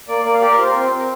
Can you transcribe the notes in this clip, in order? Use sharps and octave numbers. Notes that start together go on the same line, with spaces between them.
A#3 D5
A#3 D5
F5
G4 D5
A#4
F4 C5
C4 A#4
C5
C4
A#4